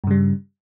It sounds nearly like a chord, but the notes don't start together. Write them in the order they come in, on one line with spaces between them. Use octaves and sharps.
G2 C#3 G3